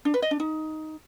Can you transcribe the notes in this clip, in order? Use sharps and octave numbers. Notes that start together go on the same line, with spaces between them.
D4
B4
D#5
D4
D#4